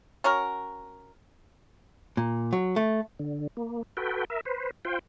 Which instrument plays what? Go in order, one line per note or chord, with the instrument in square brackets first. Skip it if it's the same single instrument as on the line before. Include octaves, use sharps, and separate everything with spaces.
[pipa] C#4 F#4 A#4
[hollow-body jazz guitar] A#2
F#3
A3
[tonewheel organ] D3
A#3
F#4 A4 B4 G5
A#4 E5
B4 C5
F4 C5 G5